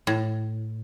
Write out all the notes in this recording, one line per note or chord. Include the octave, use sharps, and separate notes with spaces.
A2